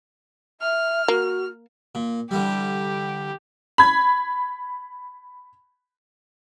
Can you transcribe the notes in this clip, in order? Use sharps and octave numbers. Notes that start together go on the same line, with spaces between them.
E5 F6
A#3 F#4
A#2
D3 E3 G3 G4
B5 G#6